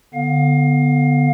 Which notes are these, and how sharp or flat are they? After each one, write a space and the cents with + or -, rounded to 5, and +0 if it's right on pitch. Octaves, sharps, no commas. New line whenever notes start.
D3 +0 B3 +0 F5 +25